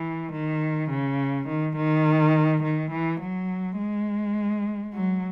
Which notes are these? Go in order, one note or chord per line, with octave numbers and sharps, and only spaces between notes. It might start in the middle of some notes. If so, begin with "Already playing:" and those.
Already playing: E3
D#3
C#3
D#3
D#3
D#3
E3
F#3
G#3
F#3